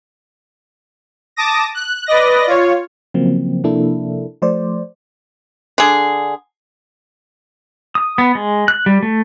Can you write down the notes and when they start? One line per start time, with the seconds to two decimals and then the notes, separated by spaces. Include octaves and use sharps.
1.36 A5 D6 D#6 A#6
1.75 F#6
2.06 B4 D5 D#5 A#6
2.47 F4 C#5
3.14 C#3 F3 F#3 A#3 C4
3.64 C3 F3 A#3 D4 E4 A4
4.42 F3 A3 C5 D5
5.78 D3 G#4
7.95 D#6
8.18 B3
8.35 G#3
8.68 F#6
8.86 G3
9.03 A3